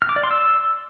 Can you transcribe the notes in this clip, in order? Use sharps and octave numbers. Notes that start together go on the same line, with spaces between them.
F6
D6
D5
C6
E6